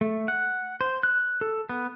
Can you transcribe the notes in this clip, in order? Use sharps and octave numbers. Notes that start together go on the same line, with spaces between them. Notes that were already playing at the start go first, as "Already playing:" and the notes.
A3
F#5
C5
F#6
A4
B3